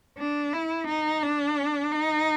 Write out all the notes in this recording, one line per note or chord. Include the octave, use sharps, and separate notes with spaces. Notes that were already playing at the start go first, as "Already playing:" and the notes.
D4
E4
D#4
D4
D#4